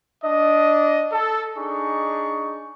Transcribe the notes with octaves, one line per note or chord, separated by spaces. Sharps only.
D4 D#5
A4
D4 D#4 G#4 C#6